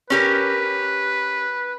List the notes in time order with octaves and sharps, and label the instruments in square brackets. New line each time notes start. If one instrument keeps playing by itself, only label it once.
[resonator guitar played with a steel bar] C#4 G4 A#4 [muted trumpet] B4